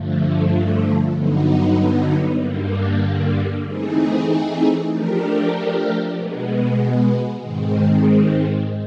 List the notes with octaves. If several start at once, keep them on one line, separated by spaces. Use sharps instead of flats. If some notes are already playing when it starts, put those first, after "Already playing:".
Already playing: G2 D3 F3 A3
G2 D3 F#3 B3 D#4
G2 D3 G3 A#3
E3 A3 C4 D#4 G#4
F3 A3 D4 G4 A#4
B2 G#3 B3
G#2 D#3 G#3 C4